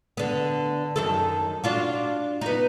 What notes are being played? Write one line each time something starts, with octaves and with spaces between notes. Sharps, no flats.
D3 B3
F#2 D#3 A4
D4 F4 F#4
B3 D#4